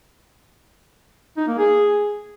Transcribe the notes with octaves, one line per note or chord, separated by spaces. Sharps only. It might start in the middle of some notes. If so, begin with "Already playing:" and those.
D#4
A#3
G#4